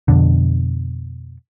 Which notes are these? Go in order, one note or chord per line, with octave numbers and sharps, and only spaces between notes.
F2 B2 D3